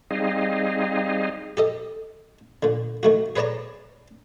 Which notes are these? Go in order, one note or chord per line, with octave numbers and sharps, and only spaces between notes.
G3 C4 D#4 G#4 D#5 F5
G4 A4 D#5
A#2 D3
D#3 A3 F#4
G#4 B4 C#5 D5 A5 A#5